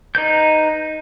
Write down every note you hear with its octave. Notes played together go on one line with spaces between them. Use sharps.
D#4 B4 G6